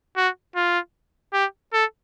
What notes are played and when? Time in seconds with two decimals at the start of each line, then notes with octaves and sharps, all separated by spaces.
0.17 F#4
0.55 F4
1.33 G4
1.73 A4